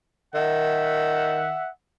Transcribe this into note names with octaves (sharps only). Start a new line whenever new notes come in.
D#3 E5 F#5